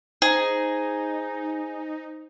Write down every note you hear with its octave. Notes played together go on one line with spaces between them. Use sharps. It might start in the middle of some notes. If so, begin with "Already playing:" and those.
D#4 G#4 C5 A#5